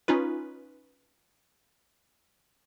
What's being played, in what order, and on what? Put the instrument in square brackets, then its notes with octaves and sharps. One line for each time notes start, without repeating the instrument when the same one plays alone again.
[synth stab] C#4 D#4 F4 B4